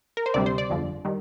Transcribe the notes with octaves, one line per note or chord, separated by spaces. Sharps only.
A#4
C5
D2 C3 G3 D5
C5
D5
G1 F2 D3 F3
D#3 G3